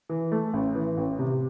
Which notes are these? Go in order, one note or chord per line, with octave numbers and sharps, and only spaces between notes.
E3
A3
A1
E3
A1
C3